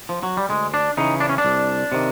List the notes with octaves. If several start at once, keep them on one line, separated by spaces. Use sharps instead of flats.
F3
F#3
G3
D2 G#3
D4
C#3 E3 D#4
D4
C#4
D4
C2
C3 D#3